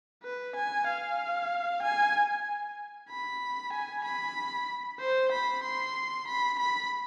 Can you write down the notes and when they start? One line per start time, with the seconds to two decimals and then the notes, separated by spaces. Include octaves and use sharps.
0.24 B4
0.56 G#5
0.87 F5
1.82 G#5
3.09 B5
3.73 G#5
4.04 B5
5.00 C5
5.32 B5
5.64 C6
6.28 B5
6.59 B5